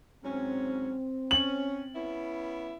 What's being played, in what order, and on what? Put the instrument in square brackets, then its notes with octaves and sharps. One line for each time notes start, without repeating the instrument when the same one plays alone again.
[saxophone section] G#2 F#3 C#4 [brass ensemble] C4
[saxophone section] C#4 [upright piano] F#7
[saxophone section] B3 C#4 E4